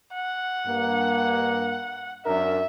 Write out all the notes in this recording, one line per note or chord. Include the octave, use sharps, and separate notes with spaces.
F#5
G2 A#3
F#2 D4 A#4 E5